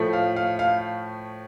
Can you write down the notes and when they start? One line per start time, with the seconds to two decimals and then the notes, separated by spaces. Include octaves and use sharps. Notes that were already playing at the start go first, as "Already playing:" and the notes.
Already playing: A2 F3 A3
0.13 F5
0.36 F5
0.59 F5